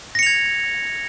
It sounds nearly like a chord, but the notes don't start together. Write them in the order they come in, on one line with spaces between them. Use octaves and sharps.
A#6 C#7 F7 G#6